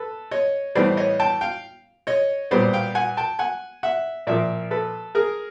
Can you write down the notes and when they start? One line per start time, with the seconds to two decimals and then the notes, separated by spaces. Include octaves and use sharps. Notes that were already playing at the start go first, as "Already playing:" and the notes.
Already playing: A4 B4
0.31 C#5 D#5
0.75 A2 E3 G3 B3 C5 D5
0.97 C#5 D#5
1.20 G5 A5
1.41 F5 G5
2.07 C#5 D#5
2.51 A#2 G3 B3 C5 D5
2.73 F5 G5
2.95 F#5 G#5
3.17 G5 A5
3.39 F#5 G#5
3.83 E5 F#5
4.27 A#2 F3 A#3 D5 E5
4.71 A4 B4
5.15 G#4 A#4